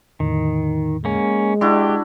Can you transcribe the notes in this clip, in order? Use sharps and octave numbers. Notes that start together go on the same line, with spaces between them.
E2 A2 D3 D#3
G#3 A#3 C#4
D4 E4 F#4 G4 C6 D6